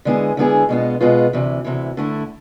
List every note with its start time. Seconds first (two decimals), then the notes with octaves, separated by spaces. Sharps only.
0.05 D3 G#3 B3 E4 G#4
0.37 D3 G#3 B3 E4 G#4
0.69 B2 G#3 B3 F4
1.01 B2 G#3 B3 F4
1.33 D2 C3 E3
1.64 D2 C3 E3
1.97 D3 A3 E4